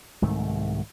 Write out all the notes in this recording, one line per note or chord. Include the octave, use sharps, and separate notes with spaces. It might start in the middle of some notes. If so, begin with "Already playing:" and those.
C2 G#2 D#3 A3